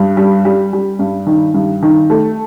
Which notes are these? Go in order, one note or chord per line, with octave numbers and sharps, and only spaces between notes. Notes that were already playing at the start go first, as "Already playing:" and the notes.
Already playing: G2
G3
G3
G3
G2
D#3
G2
D#3
A3